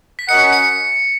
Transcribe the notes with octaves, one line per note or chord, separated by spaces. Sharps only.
B6
C#4 F#4 A#4 D#5 F#5 C#7
C#7